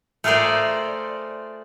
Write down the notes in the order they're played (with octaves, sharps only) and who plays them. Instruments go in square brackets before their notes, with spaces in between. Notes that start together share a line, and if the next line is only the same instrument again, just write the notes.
[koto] A3 F4 G#4 A#4 C5 D5